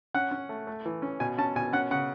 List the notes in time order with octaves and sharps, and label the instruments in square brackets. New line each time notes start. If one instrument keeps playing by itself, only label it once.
[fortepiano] C#4 F#5
C#4
A3
A3
E3
C#4
B2 G#5
C#4 A5
B2 G#5
C#4 F#5
C#3 F#5